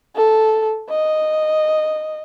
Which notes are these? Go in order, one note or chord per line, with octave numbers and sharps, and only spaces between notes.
A4
D#5